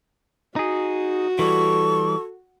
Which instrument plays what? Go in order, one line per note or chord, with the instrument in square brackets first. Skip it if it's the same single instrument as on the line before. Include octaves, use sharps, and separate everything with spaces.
[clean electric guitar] D#4 G#4 [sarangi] F#4
[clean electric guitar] E3 G3 [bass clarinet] A4 [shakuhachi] C#6